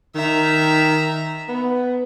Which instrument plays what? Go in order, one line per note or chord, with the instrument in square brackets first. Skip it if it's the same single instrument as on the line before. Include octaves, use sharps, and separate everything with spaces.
[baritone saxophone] D#3 [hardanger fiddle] E5 A#5
[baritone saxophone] B3